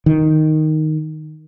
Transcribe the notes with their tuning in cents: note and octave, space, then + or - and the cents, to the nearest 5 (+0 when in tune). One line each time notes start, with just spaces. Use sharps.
D#3 +0